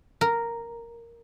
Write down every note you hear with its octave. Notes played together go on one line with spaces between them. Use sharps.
A#4